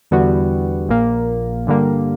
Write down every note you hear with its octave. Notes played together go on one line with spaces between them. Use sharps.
E2 D3 G3 B3 F#4
A#1 A#2 A#3
G2 D3 G3 A#3